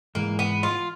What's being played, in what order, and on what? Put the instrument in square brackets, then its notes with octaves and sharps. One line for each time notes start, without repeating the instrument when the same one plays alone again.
[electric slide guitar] G#2 E3 G#3 [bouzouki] A#3
[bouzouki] B3
F4